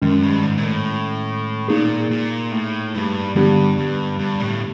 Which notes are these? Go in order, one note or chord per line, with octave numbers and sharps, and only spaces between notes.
F#2 D#3 G#3 C#4
G2
G#2
A#2
A2
A#2 A#3 D#4 G#4
A#2
A2
G2
G2 D3 G3 B3 D4 G4
G2
G2
A2